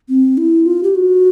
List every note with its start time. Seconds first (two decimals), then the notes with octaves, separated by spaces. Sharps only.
0.09 C4
0.38 E4
0.66 F4
0.83 G4
0.95 F#4